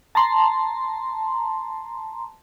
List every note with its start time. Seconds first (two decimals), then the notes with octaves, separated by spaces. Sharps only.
0.15 A5 A#5 C6